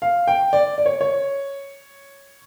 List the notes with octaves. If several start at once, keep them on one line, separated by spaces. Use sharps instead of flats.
F5
G5
D5
D5
C#5
C#5